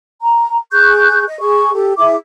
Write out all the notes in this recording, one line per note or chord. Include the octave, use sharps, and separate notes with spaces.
A#5
G#4 C#6 F#6 G6
D#5
G#4 C#6
G4 A4
E4 G#4 E5 D6